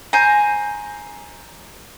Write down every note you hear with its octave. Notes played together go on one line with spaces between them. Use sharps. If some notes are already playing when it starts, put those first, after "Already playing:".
C5 G#5 A#5